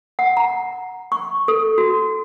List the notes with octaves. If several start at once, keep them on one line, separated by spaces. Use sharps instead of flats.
F#5
A#5
C#6
A4
F#4